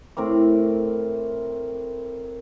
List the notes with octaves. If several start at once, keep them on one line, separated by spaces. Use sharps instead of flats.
A2 C4 A#4 D6